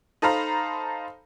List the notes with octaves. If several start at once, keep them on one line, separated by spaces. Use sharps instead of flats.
D#4 A4 C5 F5 A#5 B5